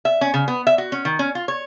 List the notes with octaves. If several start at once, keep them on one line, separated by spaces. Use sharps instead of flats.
E5
C#4
C#3
B3
E5
F#4
C#4
D#3
C#4
F4
C#5